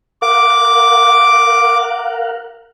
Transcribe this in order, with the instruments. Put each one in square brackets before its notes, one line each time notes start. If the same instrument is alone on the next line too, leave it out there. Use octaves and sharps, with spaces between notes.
[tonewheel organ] A#4 F5 F#5 [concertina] D6